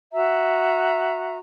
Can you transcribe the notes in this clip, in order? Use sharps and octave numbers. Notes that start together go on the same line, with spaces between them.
F#4 E5 A#5